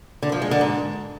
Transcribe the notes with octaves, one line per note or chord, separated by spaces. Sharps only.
D3
F3
G#3
D3
G#2